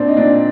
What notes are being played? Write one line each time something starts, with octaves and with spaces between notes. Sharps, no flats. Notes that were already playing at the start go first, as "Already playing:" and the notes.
Already playing: A#2 C4 D4
D#4
A#2 D4